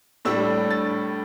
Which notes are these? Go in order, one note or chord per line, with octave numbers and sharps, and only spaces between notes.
A2 G3 D4 E6
A6